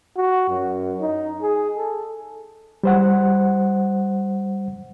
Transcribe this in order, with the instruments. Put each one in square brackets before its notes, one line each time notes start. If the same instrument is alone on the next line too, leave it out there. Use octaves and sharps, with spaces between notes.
[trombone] F#4
F#2
D#4
G#4
A4
[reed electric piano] G3 C5 F#5